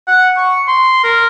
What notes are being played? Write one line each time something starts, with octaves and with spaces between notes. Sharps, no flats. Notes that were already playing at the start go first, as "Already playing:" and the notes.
F#5
C#6
C6
A#4